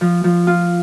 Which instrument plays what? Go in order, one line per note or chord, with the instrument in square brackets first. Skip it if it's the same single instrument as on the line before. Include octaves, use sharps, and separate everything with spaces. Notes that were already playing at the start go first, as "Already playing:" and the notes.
[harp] F3
F3
F4